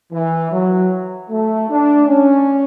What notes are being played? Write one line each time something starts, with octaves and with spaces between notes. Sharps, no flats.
E3
F#3
A3
D4
C#4